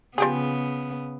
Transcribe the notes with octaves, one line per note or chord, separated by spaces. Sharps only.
C#3 F3 B3 G4 G#4